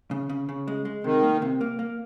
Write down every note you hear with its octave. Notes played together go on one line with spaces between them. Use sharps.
C#3
C#3
C#3
G#3
G#3
C3 D#3
A#3
C3
A#3
A#3